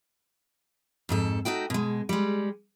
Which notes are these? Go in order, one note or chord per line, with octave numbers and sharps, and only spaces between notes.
F2 G#2 A4
A3 D#4 F#4 G5
B2 G#3
G3 G#3